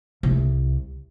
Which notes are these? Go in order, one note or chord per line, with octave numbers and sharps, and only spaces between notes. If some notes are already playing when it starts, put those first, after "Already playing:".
C2